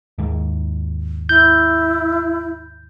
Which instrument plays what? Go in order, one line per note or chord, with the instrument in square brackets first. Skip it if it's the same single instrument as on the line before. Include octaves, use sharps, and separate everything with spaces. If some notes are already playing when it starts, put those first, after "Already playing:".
[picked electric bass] D#2 G#2
[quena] E4 [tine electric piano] G6